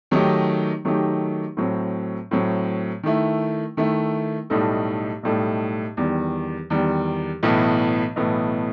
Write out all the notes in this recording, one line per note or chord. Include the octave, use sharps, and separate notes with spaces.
D#3 F#3 A3 D#4 G4
D#3 F#3 A3 D#4 G4
A2 F#3 C4
A2 F#3 C4
D#3 A3 E4
D#3 A3 E4
B1 A2 G3 D#4 A4
B1 A2 G3 D#4 A4
E2 D#3 G3
E2 D#3 G3
B1 A2 E3 B3
B1 A2 E3 B3